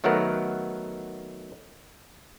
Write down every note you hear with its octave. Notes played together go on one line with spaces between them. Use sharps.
D#3 F#3 A3 B3 A#4 F#5